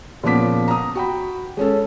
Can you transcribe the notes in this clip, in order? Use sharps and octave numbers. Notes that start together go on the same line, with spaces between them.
A#2 C#3 F3 B3 D6 B6
A#5 D#6
F#4 G5 B5
G#3 C#4 A4